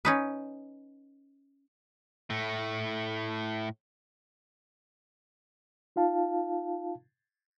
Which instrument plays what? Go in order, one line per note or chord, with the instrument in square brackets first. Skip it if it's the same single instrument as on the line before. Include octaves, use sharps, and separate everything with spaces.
[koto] C#4 D#4 B4
[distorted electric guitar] A2 A3
[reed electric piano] D#4 F4 F5 A5